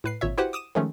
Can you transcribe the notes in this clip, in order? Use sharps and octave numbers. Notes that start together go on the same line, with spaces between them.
A2 B4 C7
G#1 A#2 C#5 E5
E4 F#4 G4 B4 C5 F#5
D6 D#6 D#7 E7
D#3 F3 G#3 A3 C#4